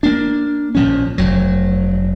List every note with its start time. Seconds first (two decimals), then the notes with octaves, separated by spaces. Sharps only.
0.03 A#3 D4
0.75 A#1 F3 C#4
1.18 F1 F#3